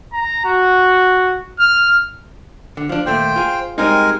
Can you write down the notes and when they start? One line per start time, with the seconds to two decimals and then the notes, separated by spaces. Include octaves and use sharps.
0.13 A#5
0.45 F#4
1.59 F6
2.77 D3
2.89 F3 D4
3.06 D#2 A#2 A3 C5 G5
3.36 F4 G#4
3.78 G3 G#3 C4 D#4 A#4 G#5